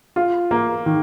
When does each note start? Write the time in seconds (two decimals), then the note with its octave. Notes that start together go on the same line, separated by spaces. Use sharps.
0.16 F4
0.51 A#3
0.86 D#3